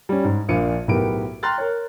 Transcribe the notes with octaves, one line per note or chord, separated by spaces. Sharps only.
G3 C#4
G#2
A#1 A#2 D4 F5 C#7 D#7
B1 A2 B3 G4 A#4 D7
G5 A#5 C6 F6 F#6 A6
A#4 C#5